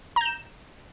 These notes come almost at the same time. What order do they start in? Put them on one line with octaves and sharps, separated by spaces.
A#5 G6 E7